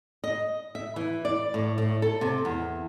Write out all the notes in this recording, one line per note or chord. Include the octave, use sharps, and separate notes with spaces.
D#5
E5
E3
D5
A2
A2
A4
C3
E2